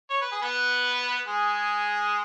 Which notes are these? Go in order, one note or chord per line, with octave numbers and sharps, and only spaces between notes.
C#5
B4
G#4
B3 B4
G#3 G#4